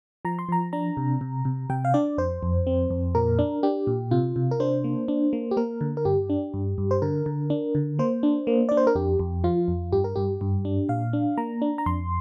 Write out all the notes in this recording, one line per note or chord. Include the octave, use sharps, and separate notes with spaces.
F3 A#5
C6
F3 A#5
D4 A#5
C3
C3
C3
C3 G5
F5
D4 D5
F2 C5
F2
C4
F2
A#2 A#4
D4
D4 G4
A#2
C3 F4
C3
A#4
D4 C5
A#3
D4
A#3
G4
A#3 A#4
D3
A#4
G2 G4
D4
G2
G2
C5
D3 A#4
D3
D4
D3
A#3 C5
D4
A#3
D4 D5
C5
A#4
F2 G4
F2
F3 F4
F2
G2 G4
A#4
G2 G4
G2
D4
A#2 F5
D4
A#3 A#5
D4
A#5
F2 C6